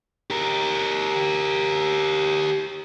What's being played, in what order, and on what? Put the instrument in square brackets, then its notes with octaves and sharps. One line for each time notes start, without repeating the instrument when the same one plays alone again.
[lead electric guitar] G4 A#4